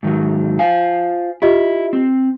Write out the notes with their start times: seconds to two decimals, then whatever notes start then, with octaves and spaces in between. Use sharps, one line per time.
0.03 G#2 D#3 F#3
0.59 F4 C5 F5 G#5
1.42 E4 F4 G4 D#5
1.93 C4